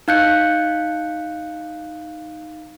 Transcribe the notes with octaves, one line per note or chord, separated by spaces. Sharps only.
D#4 F5 F#6 G6 C#7